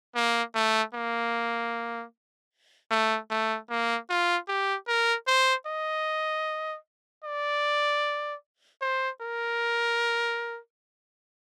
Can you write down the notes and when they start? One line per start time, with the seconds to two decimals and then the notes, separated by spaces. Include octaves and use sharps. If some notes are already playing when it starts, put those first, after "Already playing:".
0.16 A#3
0.55 A3
0.95 A#3
2.91 A3
3.31 A3
3.70 A#3
4.10 F4
4.49 G4
4.88 A#4
5.27 C5
5.67 D#5
7.25 D5
8.82 C5
9.22 A#4